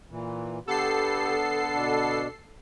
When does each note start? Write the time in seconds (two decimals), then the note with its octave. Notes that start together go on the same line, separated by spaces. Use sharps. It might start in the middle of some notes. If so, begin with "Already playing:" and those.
0.11 A#2 E3
0.67 D3 B3 G4 A4 C7
1.72 B2 D4